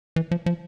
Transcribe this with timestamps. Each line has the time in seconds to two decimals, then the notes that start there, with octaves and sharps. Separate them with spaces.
0.16 E3
0.31 F3
0.46 F3